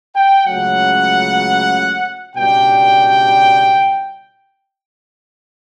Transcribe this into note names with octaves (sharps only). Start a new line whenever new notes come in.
G5
C#2 C#3 F#3 A3 F#5
C#2 B2 G3 D4 G5